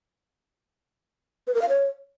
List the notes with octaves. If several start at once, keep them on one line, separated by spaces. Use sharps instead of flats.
B4
A#4
F5
C#5